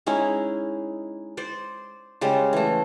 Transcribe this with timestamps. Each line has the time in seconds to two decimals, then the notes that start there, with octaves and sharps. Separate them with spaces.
0.07 G#3 C#4 D#4 E4
1.37 C5 D5
2.21 C#3 G3 G#3 C5
2.53 E3 A3